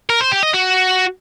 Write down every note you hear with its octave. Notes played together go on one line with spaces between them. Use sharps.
A#4
C5
G4
D#5
F#4